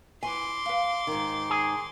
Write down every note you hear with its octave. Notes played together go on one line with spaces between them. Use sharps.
E3 G#5 C6 D6
B4 F5
G#2 D#3
G#4